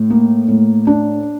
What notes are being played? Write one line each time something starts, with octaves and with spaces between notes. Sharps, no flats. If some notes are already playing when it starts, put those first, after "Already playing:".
Already playing: A2
A#3
A2
D4